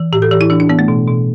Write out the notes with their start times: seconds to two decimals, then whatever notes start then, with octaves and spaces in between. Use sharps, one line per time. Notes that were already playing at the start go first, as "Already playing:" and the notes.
Already playing: E3
0.13 A2 G4
0.22 A4
0.31 E3 G4
0.41 E4
0.50 E3 D4
0.60 D4
0.69 E3 B3
0.79 A3
0.88 B2
1.07 B2